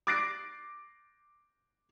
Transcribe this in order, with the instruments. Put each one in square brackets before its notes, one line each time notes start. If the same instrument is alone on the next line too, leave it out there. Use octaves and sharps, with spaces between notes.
[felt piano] D6 F#6 A6 A#6 C7 D7